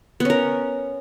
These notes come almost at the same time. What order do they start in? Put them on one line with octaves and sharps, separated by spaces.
B3 C#4 A#4